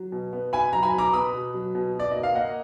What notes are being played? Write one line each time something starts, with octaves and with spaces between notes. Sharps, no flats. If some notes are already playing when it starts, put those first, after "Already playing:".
Already playing: F#3
B2
B3
B2 G#5 B5
F#3 A#5
G#5 B5
B2
A#5 D6
B3 B5 D#6
B2
F#3
B2
B2 D5
A#3 D#5
F5
A#3 D#5 F#5